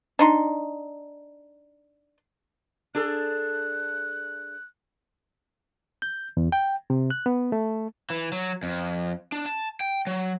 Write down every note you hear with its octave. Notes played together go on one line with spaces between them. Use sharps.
D4 D#4 C6
D4 G#4 A4 F#6
G6
E2
G5
C3
F#6
B3
A3
E3
F#3
F2
D4
A5
G5
F#3